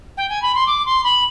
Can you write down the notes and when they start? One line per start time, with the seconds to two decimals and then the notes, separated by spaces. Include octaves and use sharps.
0.17 G5
0.29 G#5
0.42 B5
0.54 C6
0.66 D6
0.85 C6
1.03 B5